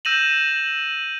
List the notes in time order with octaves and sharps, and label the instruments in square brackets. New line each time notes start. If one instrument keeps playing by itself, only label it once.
[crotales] E6 G6 A#6 D#7 E7 F#7